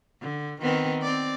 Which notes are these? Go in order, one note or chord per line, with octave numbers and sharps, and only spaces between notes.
D3
D#3 B3 C4
C4 D5